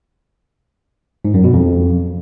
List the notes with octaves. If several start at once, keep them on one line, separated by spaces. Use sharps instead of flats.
G#2
F#2
B2
F2